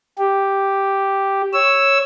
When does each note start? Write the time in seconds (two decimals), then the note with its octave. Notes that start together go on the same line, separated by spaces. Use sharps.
0.19 G4
1.54 C#5 E6